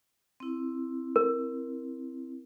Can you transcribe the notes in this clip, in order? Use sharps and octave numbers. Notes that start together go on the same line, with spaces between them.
C4 E4
A#4